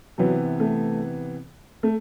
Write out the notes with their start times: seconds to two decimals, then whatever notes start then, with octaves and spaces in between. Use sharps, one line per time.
0.18 C3 E3 F#3 B3
0.60 A3
1.83 A3